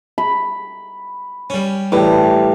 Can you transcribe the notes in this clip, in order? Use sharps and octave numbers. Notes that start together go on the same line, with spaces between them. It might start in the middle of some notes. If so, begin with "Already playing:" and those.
B5
G3 C#4
A2 E3 G3